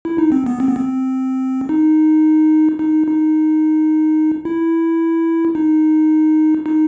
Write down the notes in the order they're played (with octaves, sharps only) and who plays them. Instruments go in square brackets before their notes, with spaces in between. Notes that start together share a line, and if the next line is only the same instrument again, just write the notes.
[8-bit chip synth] E4
D#4
C4
B3
C4
B3
C4
D#4
D#4
D#4
E4
D#4
D#4